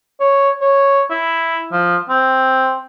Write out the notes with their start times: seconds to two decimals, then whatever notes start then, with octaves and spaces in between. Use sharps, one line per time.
0.20 C#5
0.61 C#5
1.10 E4
1.72 F3
2.10 C4